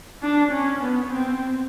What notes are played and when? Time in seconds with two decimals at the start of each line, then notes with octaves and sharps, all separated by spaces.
0.22 D4
0.51 C#4
0.80 B3
1.09 C4